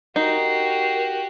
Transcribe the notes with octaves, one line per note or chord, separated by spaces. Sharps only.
D#4 F#4 G4 A#4 C7